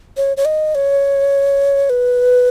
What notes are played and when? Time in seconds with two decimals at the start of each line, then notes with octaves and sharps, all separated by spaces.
0.17 C#5
0.37 C#5
0.45 D#5
0.75 C#5
1.90 B4